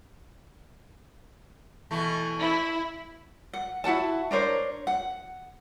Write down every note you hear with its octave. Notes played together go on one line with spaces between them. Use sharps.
B2 E3 A3
E4
F#5
E4 F#4 F#5 A5
D4 A#4 C5 C#5
F#5